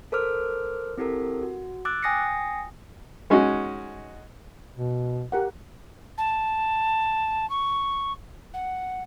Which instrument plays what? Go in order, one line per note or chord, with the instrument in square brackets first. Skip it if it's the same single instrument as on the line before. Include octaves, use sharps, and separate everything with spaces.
[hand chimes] A4 A#4 C5 D6 F6
C4 E4 G4 A4 A#4
F#4
D6 E6 F#6 A6
G5 G#5 D#6 A#6 C7 C#7
[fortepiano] G#3 C#4 D#4 F#4
[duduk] B2
[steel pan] G4 A#4 F#5
[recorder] A5
C#6
F#5